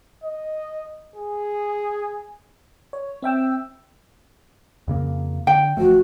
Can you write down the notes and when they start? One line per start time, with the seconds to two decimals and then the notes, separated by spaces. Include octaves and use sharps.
0.24 D#5
1.16 G#4
2.93 C#5
3.22 C4 E5 G5 E6
4.88 F2 C#3 A#3
5.47 D3 G5
5.77 F#1 F3 A3 F#4